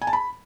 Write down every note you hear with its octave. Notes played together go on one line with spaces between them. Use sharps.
G#5
A5
B5